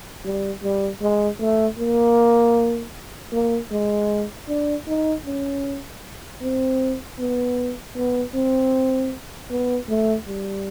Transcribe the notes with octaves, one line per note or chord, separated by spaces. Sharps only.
G3
G3
G#3
A3
A#3
A#3
G#3
D4
D#4
C#4
C4
B3
B3
C4
B3
A3
G3